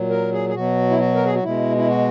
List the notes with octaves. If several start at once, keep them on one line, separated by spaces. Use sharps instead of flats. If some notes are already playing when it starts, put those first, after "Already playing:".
Already playing: A#2 F#3
A#4
G#4
G#4
B2 F#3 F#4
E4
F#4
A#4
G#4
F#4
B2 G#3 E4
E4
F#4